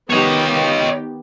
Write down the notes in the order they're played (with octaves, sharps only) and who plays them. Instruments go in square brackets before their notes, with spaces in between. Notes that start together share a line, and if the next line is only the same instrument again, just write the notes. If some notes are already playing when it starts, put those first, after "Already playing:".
[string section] D#3 B3 G4 [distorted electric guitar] C#5 D#5